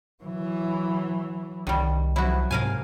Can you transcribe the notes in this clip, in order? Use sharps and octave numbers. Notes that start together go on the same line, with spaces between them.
E3 F#3
C2 D#3 G3
F3 F#3 E4 F#4
G#2 C3 A#4 F5 G#5